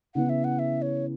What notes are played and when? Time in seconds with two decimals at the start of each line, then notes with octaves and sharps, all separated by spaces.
0.15 C#3 E3 B3 E4 F#5
0.29 E5
0.44 F#5
0.59 E5
0.82 C#5